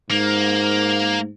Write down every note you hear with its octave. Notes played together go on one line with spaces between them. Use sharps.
G#2 A#3